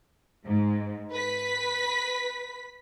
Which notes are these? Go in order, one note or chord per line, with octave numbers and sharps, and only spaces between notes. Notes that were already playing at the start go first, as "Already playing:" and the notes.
G#2
B4 B6